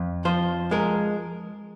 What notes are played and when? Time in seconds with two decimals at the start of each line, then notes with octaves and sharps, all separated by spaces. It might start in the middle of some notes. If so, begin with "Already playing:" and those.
Already playing: F2
0.25 F3 C5
0.71 G#3 A#4